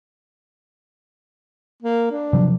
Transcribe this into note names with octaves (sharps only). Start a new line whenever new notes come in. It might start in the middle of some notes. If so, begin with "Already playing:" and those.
A#3
D4
C3 F3 F#3